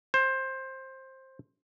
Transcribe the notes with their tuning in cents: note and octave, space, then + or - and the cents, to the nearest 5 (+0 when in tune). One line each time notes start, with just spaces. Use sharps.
C5 +15